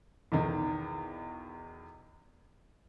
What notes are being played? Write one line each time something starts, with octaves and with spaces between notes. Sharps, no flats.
B1 E2 D#3